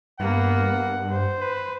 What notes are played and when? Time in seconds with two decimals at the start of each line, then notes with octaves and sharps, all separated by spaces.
0.20 G2 A#3 B3 F#5
1.11 C5
1.41 B4